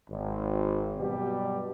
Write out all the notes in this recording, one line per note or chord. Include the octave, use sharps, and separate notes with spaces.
G#1
G2 B2 F#3 G3 G4